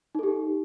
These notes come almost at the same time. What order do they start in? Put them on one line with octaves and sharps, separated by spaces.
D#4 A4 G4